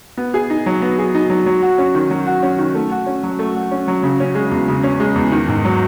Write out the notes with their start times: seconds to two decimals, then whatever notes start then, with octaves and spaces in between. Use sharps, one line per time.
0.17 B3
0.34 G#4
0.50 D#4
0.66 F#3
0.82 B3
0.98 G#4
1.15 D#4
1.30 F#3
1.46 F#3
1.62 F#4
1.78 C#4
1.95 D#3
2.10 F#3
2.27 F#4
2.43 C#4
2.59 D#3
2.75 A3
2.92 F#4
3.06 C#4
3.23 F#3
3.39 A3
3.56 F#4
3.71 C#4
3.88 F#3
4.03 C#3
4.20 C#4
4.35 G#3
4.51 E2
4.68 C#3
4.83 C#4
5.00 G#3
5.16 E2
5.32 D#3
5.49 G#2
5.65 F#3